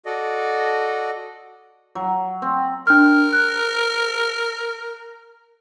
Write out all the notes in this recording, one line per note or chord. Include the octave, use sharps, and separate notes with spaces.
F#4 A4 D5 D#5
F#3
C4
D4 A#4 F6
F#6